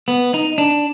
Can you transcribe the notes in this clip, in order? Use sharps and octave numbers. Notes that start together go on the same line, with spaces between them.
B3
D#4
D4